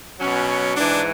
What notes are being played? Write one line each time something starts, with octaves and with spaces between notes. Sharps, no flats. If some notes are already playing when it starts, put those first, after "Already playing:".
B2 F#3 C#4
G#2 E3 D4